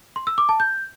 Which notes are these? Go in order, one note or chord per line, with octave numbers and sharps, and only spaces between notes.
C6
E6
D6
A5
G6